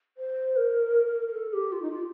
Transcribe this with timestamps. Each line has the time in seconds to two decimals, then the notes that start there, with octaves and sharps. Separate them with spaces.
0.17 C5
0.56 A#4
1.28 A#4
1.33 A4
1.53 G4
1.72 F4
1.82 D#4
1.91 F4